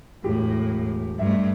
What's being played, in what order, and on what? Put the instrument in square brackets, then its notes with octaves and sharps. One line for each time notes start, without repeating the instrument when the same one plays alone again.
[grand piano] E1 G4 [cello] A2
[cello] G2 A3 [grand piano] E5